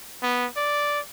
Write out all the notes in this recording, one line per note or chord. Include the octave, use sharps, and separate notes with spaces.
B3
D5